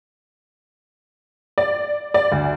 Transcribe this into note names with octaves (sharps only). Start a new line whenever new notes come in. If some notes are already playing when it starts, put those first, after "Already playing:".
D5
D5
D2